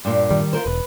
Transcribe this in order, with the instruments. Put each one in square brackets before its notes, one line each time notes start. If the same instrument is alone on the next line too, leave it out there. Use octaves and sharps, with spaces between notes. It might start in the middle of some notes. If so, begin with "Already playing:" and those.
[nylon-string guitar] G2 A#2
[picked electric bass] D#3 G3
[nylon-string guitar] F4 A#4 C5
[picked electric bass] E1 [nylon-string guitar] B4